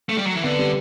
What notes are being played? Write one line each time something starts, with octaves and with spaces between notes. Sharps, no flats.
A3
G3
F#3
E3
D3 B3
G3